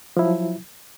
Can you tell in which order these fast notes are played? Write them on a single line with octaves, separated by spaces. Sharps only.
F3 E4 F#3